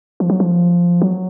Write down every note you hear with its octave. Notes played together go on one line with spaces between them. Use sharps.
F3
F#3
F3
F#3